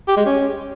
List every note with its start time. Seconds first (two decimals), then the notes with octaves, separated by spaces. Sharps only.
0.07 G4
0.17 G#3
0.26 C#4